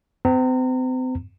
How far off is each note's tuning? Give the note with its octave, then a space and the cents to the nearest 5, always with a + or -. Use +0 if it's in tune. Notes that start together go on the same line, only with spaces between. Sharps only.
C4 -40 A#5 -35